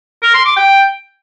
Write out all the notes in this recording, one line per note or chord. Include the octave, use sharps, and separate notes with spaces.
A#4
C6
D6
G5